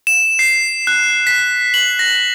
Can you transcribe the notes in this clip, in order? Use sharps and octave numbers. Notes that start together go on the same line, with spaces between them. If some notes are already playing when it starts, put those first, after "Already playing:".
E7
C7
F#6
B6
F#7
A#6